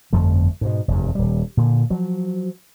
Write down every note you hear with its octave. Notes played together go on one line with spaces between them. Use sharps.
G1 F2 F3 A3
G#2 B2
F1 E2 G2
D#1 G3
A#2 D3
F3 F#3